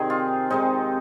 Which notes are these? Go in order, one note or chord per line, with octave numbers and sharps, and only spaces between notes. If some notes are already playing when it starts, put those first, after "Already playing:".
Already playing: C3 D#3 C4 D#4 G#4
F4
C3 G#3 C4 D#4